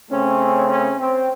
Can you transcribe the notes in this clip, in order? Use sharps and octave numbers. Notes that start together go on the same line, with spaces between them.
C#3 A3 C4 C#4
C#4
C4